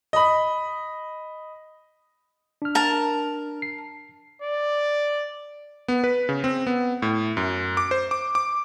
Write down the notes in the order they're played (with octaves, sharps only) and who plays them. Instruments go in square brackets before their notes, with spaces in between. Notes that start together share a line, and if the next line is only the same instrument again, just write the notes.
[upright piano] D#5 B5
[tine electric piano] D4 F6
[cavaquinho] A#4 A5
[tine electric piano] C7
[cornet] D5
[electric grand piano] B3
B4
C#3
C4
B3
A2
F#2
D6
C5
D6
D6